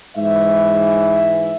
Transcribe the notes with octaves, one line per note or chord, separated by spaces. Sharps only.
G#2 E3 E5